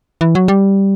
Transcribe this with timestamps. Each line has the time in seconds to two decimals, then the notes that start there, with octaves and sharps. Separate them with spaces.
0.21 E3
0.35 F#3
0.48 G3